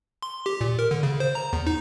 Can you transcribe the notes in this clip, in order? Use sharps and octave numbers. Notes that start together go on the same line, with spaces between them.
C6
G4
A#2
A#4
D3
C#3
C5
A#5
E2
D#4